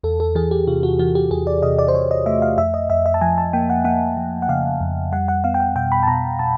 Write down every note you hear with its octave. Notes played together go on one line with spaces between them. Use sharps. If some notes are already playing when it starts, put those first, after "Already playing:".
E2 A4
A4
E3 G#4
G4
C3 F4
F#4
E3 F#4
G4
E2 G#4
D5
C3 D#5
D5
C5
C3 C#5
D#5
A3 E5
F5
F2 E5
D#5
F2 E5
E5
A5
F3 G#5
A5
A#3 G5
F#5
A#3 F#5
F3
F#5
C#3 F5
F2
G3 F#5
F#5
B3 F5
G5
F#5
B2 G5
B5
A5
B2 A#5
B2 A5